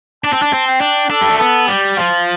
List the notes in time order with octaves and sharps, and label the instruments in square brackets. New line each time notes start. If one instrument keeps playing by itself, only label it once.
[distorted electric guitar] D4 [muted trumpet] A5
[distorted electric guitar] C4
D4
C4
[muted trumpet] G5
[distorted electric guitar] D4
[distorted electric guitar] D4 [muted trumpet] A4
[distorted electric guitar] G3
A3
[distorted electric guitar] B3 [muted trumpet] A4
[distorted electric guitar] G3 [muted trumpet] G4
[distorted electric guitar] F3 [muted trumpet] F4